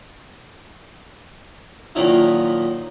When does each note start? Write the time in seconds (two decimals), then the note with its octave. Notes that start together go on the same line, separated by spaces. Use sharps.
1.95 A#2 D#3 F3 F#3 D#4 E4